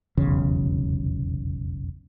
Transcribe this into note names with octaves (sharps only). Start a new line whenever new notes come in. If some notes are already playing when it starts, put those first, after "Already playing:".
F1 B1 E2 C#3